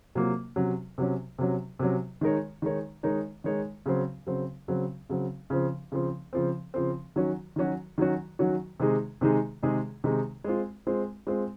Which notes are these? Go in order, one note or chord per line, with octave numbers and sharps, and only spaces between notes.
C3 F#3 A#3 F4
C3 F#3 C#4
C3 F#3 C#4
C3 F#3 C#4
C3 F#3 C#4
D#3 G#3 D#4 A#4 C#5
D#3 G#3 D#4 A#4 C#5
D#3 G#3 D#4 A#4 C#5
D#3 G#3 D#4 A#4 C#5
C#3 F#3 C4
C#3 F#3 C4
C#3 F#3 C4
C#3 F#3 C4
C#3 F3 C4
C#3 F3 C4
C#3 F3 C4
C#3 F3 C4
D#3 F#3 C#4 F#4
D#3 F#3 C#4 F#4
D#3 F#3 C#4 F#4
D#3 F#3 C#4 F#4
C3 D#3 G#3 D#4 G#4
C3 D#3 G#3 D#4 G#4
C3 D#3 G#3 D#4 G#4
C3 D#3 G#3 D#4 G#4
G#3 C4 F4
G#3 C4 F4
G#3 C4 F4